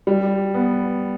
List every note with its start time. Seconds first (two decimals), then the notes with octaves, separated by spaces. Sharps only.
0.07 G3
0.54 B3